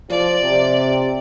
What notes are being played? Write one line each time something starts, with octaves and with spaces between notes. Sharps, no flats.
F3 D5
C3